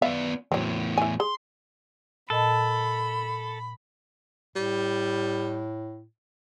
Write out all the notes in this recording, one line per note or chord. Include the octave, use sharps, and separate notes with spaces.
B3 D5 E5 F5
E2 A2 F#3 C4
E4 G#5
G#4 C6
A#2 A4 D#5 A5 B5
A2 G3